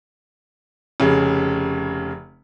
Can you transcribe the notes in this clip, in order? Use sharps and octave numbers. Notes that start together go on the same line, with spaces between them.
F1 C#3